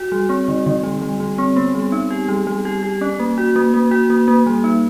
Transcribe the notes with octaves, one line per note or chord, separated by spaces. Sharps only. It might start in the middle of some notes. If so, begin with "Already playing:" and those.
Already playing: F#4
G3
C4
D3
D3
G3
G3
G3
C4
B3
G3
D#4
G4
G3
G3
G4
G4
C#4
A#3
F#4
A#3
A#3
F#4
A#3
A#3
G3
D#4